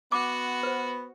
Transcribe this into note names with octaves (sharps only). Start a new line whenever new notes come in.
B3 F#4 D6
B4 C5